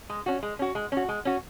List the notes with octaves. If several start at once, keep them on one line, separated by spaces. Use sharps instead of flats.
G#3
C#4 F#4
G#3
C#4 F#4
G#3
C#4 F#4
G#3
C#4 F#4